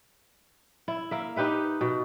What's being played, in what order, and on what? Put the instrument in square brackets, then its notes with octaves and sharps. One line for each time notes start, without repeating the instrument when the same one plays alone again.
[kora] E4
A#3 E5
D#4 G4 B4 E5
B2